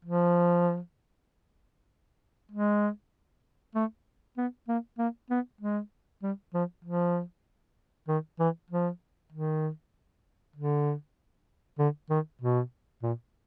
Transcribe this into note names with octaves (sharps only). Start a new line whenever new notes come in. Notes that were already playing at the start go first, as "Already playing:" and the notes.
F3
G#3
A3
B3
A#3
A#3
B3
G#3
G3
F3
F3
D#3
E3
F3
D#3
D3
D3
D#3
B2
A#2